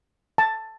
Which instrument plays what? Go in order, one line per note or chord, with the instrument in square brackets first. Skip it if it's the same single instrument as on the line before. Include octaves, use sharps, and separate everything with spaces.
[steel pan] A5